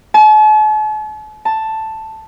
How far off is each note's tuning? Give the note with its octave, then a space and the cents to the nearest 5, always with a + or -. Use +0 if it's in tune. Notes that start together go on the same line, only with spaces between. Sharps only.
A5 -45
A5 +5